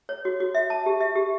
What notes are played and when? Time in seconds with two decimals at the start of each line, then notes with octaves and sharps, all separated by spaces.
0.09 C#5
0.25 F#4
0.40 F#4
0.55 E5
0.70 A5
0.86 G4
1.01 E5
1.15 G4